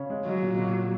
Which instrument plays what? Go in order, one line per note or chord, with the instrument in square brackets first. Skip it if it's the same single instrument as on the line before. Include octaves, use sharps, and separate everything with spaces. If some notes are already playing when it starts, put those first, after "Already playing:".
Already playing: [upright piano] C#3 C#4
G#3
[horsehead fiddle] F#3 [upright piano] G#3
[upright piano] A#2
A#2